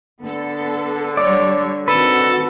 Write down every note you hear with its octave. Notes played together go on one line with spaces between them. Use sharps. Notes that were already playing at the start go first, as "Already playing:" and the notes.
D3 B3 A4
G3 C#5 D5
D#3 C4 F#4 A4 B4